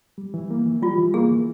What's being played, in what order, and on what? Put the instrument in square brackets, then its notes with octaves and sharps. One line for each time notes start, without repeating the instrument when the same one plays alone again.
[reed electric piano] G3
E3
A#3
E3
[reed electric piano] G3 [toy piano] F4
[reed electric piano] E3
[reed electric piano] A#3 [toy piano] G#4
[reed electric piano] E3